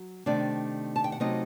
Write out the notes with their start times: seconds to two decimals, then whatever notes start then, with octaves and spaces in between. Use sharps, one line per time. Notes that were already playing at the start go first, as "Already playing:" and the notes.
Already playing: F#3
0.26 C3 D#3 A3 C4 D4 D5
0.96 A5
1.04 G5
1.12 F#5
1.20 C3 F#3 A3 C4 D#4 D#5